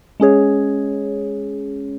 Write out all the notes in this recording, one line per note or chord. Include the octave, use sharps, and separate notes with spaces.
G#3 C#4 G#4 C#5